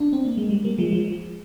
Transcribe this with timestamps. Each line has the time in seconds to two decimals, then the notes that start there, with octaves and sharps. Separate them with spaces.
0.00 D4
0.13 C4
0.25 A#3
0.37 G#3
0.50 G3
0.64 G3 A#3
0.78 F3 G#3
0.93 F3 G#3
1.08 F3